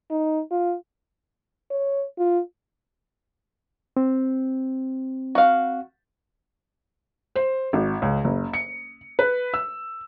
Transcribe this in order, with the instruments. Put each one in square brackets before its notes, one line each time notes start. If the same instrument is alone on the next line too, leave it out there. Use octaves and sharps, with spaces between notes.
[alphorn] D#4
F4
C#5
F4
[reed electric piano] C4
[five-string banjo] F#4 F5
[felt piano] C5
G#1
C#2
F#1
C#7
B4
E6